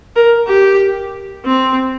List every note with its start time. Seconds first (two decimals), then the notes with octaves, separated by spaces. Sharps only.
0.16 A#4
0.47 G4
1.45 C4